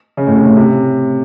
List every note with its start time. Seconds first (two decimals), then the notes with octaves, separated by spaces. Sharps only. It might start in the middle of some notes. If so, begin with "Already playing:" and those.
0.17 C#3
0.27 A2
0.37 C3
0.47 A2
0.57 C3